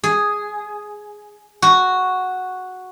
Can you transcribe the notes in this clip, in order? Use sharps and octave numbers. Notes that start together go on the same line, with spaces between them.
G#4
F#4